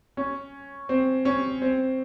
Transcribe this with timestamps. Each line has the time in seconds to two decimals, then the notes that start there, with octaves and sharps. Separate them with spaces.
0.17 C#4
0.89 C4
1.25 C#4
1.62 C4